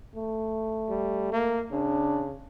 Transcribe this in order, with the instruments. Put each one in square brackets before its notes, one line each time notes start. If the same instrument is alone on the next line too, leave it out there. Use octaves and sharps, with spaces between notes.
[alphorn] A3
[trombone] G3
A#3
[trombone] C#3 [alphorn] D4